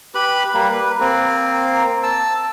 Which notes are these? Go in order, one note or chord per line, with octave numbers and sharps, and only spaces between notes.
G4 B4 B5
G3 A#3
B4
A#3 C4
A5 E6